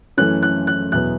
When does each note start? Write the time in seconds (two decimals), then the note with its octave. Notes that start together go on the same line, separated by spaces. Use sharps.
0.17 F#2 E3 A3 C#4 F#6
0.43 F#6
0.67 F#6
0.92 E2 B2 F#3 B3 F#6